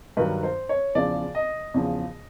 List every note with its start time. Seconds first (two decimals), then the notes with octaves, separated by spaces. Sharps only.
0.17 G2 D#3 F#3 B4
0.43 C5
0.69 C#5
0.95 E2 C#3 F3 D5
1.35 D#5
1.74 E2 C#3 F3